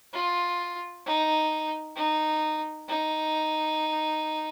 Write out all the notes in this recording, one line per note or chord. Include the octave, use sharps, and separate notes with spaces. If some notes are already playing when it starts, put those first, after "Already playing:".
F4
D#4
D#4
D#4